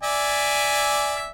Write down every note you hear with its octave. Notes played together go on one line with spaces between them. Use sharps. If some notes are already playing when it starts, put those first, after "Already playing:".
D5 E5 G#5